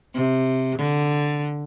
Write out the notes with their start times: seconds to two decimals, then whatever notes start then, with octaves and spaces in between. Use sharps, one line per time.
0.14 C3
0.79 D3